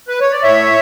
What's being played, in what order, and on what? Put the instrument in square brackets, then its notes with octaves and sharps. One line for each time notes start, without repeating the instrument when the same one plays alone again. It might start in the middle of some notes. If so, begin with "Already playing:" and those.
[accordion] B4
C#5
D5
A2 C#5 E5